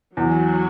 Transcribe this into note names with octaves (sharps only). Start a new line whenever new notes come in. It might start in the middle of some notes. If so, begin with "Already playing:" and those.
E2 F#3